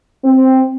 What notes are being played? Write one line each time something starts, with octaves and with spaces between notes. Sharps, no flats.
C4